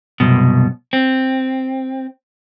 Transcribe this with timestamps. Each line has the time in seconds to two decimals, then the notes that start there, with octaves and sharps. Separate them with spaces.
0.20 C2 F#2 B2
0.93 C4